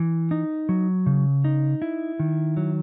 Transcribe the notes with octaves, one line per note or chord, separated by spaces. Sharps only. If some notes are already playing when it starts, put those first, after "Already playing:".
Already playing: E3
D#4
F#3
C#3
D#4
E4
D#3
F#3